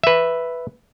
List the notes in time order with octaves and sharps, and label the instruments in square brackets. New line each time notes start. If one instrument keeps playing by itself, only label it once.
[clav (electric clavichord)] B4 E5